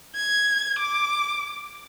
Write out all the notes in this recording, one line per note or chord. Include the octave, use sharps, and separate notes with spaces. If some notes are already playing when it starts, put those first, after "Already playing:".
G#6
D6